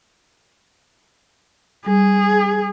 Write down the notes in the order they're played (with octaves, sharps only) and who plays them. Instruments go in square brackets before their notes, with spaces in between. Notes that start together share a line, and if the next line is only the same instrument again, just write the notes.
[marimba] G3 [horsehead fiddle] G#4